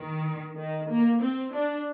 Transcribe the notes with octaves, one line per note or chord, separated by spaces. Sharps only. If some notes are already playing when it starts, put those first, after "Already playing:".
Already playing: D#3
D#3
A#3
C4
D4